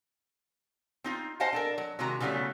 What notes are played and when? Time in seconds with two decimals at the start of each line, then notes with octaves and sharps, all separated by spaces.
1.04 C4 D#4 F4
1.40 C5 D#5 F5 F#5 G#5 A5
1.53 D4 A4 A#4
1.78 F#3
1.99 C3 D#3 G#3 F#4 A#5
2.20 C#3 E3 F#3 G3 A3 B3